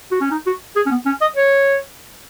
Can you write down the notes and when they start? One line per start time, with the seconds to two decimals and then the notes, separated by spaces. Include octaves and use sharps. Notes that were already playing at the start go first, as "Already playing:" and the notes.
0.12 F#4
0.21 C#4
0.31 D#4
0.47 F#4
0.76 G#4
0.87 C#4
0.91 B3
1.06 C#4
1.22 D#5
1.37 C#5